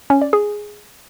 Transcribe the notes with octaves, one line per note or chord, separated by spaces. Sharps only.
C#4
D5
G#4